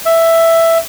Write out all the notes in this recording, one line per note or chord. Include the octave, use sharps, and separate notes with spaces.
E5